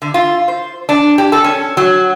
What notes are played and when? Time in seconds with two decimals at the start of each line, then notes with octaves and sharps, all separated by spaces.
0.02 D3
0.14 F4
0.48 C5
0.89 D4
1.18 G4
1.32 A4
1.44 C#4
1.77 F#3